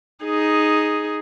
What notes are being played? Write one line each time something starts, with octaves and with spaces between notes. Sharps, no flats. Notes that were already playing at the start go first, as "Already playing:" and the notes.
D#4 G#4